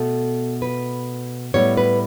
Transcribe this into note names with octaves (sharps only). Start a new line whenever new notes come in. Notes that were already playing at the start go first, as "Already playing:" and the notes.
Already playing: B2 A3 A4
B4
A2 G3 B3 C#5
B4